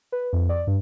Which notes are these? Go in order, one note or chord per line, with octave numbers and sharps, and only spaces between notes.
B4
F2
D5
G2